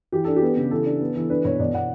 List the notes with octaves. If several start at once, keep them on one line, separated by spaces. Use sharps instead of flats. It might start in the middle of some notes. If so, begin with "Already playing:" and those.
E3 G4
D4 A4
G4
B3
C#3
E3 A4
D4
B3
E3
D4 B4
B2 C#5
B2 D5
B2 F#5